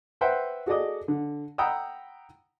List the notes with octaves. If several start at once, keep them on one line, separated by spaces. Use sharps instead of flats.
B4 C5 E5 F#5 G5
F#4 G#4 A4 D5 D#5 D#6
D3
F#5 G5 A#5 B5 D#6 E6